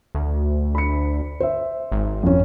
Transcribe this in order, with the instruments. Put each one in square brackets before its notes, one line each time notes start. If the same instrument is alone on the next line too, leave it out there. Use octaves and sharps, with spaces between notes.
[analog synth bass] D2
[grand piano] B5 C#7
C5 E5
[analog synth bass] G#1
[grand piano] F2 C#4